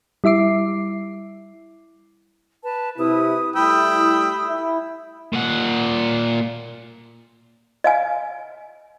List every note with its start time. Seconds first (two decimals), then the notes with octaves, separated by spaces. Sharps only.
0.24 G3 E4 E5 D6 C7
2.62 B4 A5
2.98 C3 E4 B4 D#6
3.56 G3 A3 E4 G5 B5 D#6 E6
4.47 E4
5.33 A#2 F#5
7.84 D#5 F5 G#5